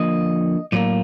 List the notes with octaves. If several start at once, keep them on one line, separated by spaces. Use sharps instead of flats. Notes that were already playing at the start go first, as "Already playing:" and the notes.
Already playing: D3 F3 A#3 D#5
A2 F#3 A#3 D5